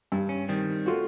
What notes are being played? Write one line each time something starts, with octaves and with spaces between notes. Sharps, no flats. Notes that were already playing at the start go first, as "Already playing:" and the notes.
G2
C#4
D#3 G3 C4
A3 F4 F#4